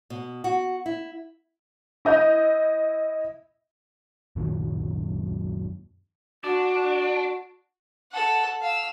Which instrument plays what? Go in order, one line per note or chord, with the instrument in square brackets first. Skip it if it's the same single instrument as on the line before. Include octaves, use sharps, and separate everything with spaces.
[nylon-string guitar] B2
F#4
E4
[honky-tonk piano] E4 D#5 G6
[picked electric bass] F#2 A#2 D#3 F#3
[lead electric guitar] D4 [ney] F#4
[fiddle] A4 F#5
F5 E6